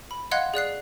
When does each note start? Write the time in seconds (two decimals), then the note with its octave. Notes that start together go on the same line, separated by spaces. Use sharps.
0.11 B5
0.31 D#5 F5 F#5 C6 F#6 G#6
0.54 G#4 D5 F#6 C7